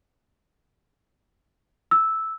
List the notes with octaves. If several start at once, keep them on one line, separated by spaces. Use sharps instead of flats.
E6